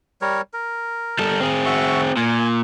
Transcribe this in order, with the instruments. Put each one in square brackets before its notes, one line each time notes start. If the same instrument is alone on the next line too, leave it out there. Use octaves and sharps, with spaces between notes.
[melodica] G3 A#4 C#5
A#4
[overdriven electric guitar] G3 A4
C4 G#4
[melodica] F#4 E5 C#6
[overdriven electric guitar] A#2 [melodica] G#5